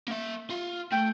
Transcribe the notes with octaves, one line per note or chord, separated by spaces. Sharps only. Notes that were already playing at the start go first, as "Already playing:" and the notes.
A#3 E5
F4
A3 G5